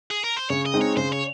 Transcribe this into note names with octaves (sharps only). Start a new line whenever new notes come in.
G#4
A#4
C5
C#3 C#5
D#5
G#3 C4 D#4
C#5
C#3 C5
C#5